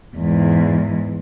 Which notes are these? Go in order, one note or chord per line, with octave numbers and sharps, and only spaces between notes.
E2 G#2